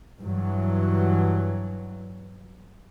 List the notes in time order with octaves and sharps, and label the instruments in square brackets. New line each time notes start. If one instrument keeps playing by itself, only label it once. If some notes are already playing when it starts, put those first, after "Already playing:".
[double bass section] G2 E3 F#3